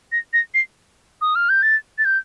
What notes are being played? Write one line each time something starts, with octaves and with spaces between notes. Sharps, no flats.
A#6
A#6
C7
D#6
F6
G6
A6
A6
G6